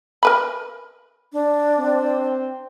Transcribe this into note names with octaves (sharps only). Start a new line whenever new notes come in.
A#4 B4 B5
D4
C4